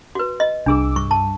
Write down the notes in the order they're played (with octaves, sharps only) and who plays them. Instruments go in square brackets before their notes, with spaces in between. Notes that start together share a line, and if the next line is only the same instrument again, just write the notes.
[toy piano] F#4 B4
D#5
[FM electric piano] C2 D6 E6 [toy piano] D4 G#4
[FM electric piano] G2 [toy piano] C#6
[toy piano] A5